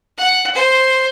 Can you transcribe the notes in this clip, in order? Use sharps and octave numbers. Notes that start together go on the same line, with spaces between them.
F#5
C5